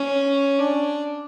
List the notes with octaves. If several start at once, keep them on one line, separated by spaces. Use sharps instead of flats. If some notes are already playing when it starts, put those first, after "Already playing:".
Already playing: C#4
D4